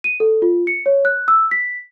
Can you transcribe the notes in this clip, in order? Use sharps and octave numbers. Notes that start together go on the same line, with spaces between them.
D#7
A4
F4
C#7
C#5
F#6
E6
B6